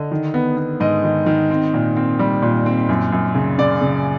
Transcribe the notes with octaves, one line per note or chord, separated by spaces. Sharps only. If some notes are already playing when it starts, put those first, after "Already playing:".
Already playing: D3 D#5
D#3
B3
B3
G#2 D#5
D#3
D#3
C4
A#2
C4
G3
A#2
C4
F#2
F#2
C#3
C#3 D5
C#3